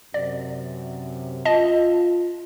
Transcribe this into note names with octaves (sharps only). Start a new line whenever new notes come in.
F#2 C3 D5
F4 D#5 A5